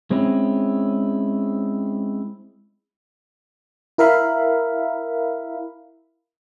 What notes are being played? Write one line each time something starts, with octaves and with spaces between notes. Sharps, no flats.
G#3 C4 C#4 E4
E4 A#4 E5 F5 B5